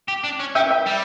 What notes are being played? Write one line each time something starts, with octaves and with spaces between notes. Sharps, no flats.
G4
D4
C#4
C#4 E5 G5
E5 G5
G3